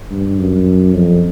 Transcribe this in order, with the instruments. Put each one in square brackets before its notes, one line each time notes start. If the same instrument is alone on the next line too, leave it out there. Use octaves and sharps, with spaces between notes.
[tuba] G2
F#2
F2